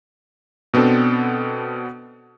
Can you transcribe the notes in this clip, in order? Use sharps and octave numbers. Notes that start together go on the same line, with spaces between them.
B2 B3 C4 D4 A4